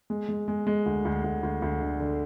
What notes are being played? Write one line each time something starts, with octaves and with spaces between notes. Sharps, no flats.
G#3
G#3
G#3
G#3
D2
D2
D2
D2
D2
D3
D3